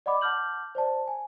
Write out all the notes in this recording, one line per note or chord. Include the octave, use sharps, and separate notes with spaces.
D5 D#5 F#5 B5 D6
F#5 A5 D6 F6 G6 F#7
C5 D5 A5
G#5